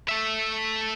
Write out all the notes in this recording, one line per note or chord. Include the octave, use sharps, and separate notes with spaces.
A3 E5